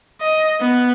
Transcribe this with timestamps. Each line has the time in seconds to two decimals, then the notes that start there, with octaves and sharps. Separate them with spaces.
0.21 D#5
0.61 B3